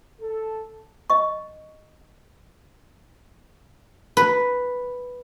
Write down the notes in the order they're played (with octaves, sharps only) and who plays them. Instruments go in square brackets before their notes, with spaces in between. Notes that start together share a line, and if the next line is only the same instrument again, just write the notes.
[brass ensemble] A4
[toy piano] D#5 C#6
[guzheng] B4